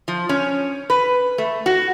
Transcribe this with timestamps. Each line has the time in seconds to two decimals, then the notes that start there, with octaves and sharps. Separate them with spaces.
0.08 F3
0.29 C#4
0.90 B4
1.38 A3
1.66 F#4